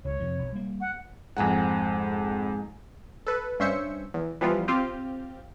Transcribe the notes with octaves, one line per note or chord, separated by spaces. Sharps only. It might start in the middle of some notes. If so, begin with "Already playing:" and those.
C#2 C#5
F2 C3
B1
G3 A#3
F#5
F2 G#2 G#3 C4 F#5
A4 B4
G2 C#4 C5 E5 C#7
E2
E3 F3 G3 B3 F4
C4 F4 G4